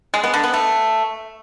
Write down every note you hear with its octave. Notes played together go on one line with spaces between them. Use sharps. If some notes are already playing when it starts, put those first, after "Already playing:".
G#3
B3
D3
B3
A3